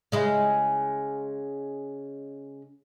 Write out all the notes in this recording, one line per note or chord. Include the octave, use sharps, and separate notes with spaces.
C#3 G#3 E4